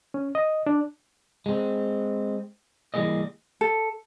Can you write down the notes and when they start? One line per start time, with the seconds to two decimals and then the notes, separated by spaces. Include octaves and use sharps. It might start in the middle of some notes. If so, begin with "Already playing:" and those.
0.14 C#4
0.35 D#5
0.66 D4
1.46 G#3 C4
2.94 E3 G3 A#3 G#4 D#5
3.61 A4